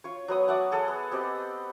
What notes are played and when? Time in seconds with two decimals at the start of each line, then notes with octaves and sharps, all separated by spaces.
0.04 F4 C#5
0.28 F#3 B3 D#6
0.48 D5 E5 F#5 A5
0.72 G#4 A4 F#5
0.88 B3
1.11 B3 C4 G4 D#5